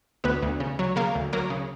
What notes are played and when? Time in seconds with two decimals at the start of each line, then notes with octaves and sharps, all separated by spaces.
0.24 D2 B3 B4
0.42 D2
0.60 C#3
0.79 F#3
0.96 C#3 A#3 A#4
1.15 D2
1.33 F#3 A#3 A#4
1.50 C#3